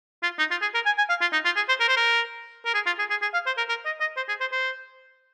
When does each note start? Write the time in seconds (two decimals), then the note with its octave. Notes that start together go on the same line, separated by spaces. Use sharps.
0.23 F4
0.39 D#4
0.51 F4
0.62 G#4
0.74 A#4
0.86 G#5
0.98 G#5
1.09 F5
1.21 F4
1.33 D#4
1.45 F4
1.56 G#4
1.69 C5
1.80 A#4
1.88 C5
1.97 A#4
2.65 A#4
2.74 G#4
2.86 F4
2.99 G#4
3.10 G#4
3.22 G#4
3.33 F5
3.46 C5
3.57 A#4
3.69 A#4
3.85 D#5
4.00 D#5
4.17 C5
4.28 G#4
4.41 C5
4.52 C5